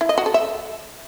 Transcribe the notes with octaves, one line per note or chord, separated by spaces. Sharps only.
E4
D#5
F#4
A4
E5